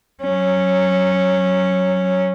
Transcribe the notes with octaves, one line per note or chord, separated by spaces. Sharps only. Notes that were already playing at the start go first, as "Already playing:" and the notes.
F#3 C#4